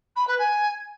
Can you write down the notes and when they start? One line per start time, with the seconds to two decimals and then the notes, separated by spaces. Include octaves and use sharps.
0.16 B5
0.27 B4
0.39 G#5